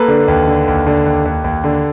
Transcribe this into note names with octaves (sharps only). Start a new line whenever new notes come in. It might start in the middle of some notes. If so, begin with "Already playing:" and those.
Already playing: A#3 A4 B4
D3
D#2
D3
D#2
D3
D#2
D#2
D#2
D3